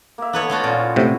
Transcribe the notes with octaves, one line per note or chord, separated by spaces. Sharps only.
A#3 E5
B3 D#4 A4 B4 C#5
A3 F4 F#4
A#2 C#4 F4
E3
A2 C3